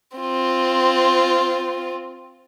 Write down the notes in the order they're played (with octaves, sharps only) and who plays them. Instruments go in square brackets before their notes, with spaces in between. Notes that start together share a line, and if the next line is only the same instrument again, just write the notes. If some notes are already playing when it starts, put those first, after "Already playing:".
[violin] C4 F4